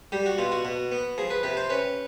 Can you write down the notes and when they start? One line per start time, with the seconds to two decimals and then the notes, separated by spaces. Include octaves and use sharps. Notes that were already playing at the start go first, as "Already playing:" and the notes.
0.12 G3 G4
0.26 F#4
0.38 B2 F4
0.52 F#4
0.65 B2
0.92 B3
1.18 F3 G#4
1.30 B4
1.43 C3 B4
1.57 C5
1.70 C#4 B4